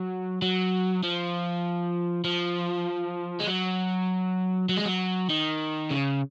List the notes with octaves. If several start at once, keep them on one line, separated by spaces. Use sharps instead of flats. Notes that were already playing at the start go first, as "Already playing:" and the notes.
Already playing: F#3
F#3
F3
F3
G#3
F#3
F#3
G#3
F#3
D#3
C#3